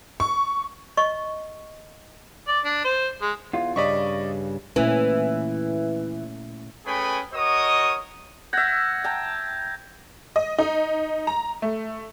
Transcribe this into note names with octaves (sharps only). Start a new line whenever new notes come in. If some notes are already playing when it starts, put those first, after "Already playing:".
C#6
D#5 C#6
D5
D4
C5
G#3
E2 F4
G2 C#3 D5 D#5 B5 C#6
A#2 E3 A3 C#4
A3 C#4 G#4 B4 G5 B5
F#4 A#4 C#5 D#5 D#6
E5 F#5 G6 G#6 A#6
G5 A5 A#5
D#5
D#4
A#5
A3